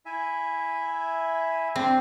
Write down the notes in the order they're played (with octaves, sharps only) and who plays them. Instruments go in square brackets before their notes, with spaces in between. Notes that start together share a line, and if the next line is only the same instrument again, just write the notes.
[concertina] E4 E5 G#5
[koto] C4 [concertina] D4 C5